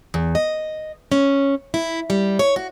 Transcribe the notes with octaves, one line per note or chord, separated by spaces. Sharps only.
E2
D#5
C#4
E4
G3
C#5
F#4